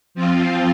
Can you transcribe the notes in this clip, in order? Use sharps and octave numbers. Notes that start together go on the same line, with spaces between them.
F3 C4 F4